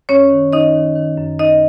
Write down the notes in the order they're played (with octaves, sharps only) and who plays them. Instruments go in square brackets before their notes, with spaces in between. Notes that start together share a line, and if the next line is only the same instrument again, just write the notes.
[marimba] F#2 C#4 C#5
D#3
D#3 D#4 D#5
D#3
D#3
F#2
F#2 D#4 D#5